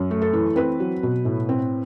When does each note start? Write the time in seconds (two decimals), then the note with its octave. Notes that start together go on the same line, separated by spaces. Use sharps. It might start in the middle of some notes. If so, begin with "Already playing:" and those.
Already playing: F#2
0.11 A3
0.22 A4
0.33 E3
0.56 C4 B4
0.80 F#3
1.03 B2
1.25 A2
1.49 C4